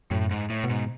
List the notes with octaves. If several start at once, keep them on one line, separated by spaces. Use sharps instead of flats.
F#2 A2
G#2
A2
B2
G#2